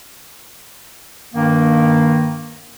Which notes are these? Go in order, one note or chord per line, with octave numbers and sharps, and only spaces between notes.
G2 D#3 A#3